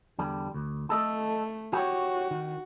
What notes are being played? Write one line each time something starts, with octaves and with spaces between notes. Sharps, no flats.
E2 D3 G3
D2
A3 A4 D#5
F#4 G4 C#5
D#3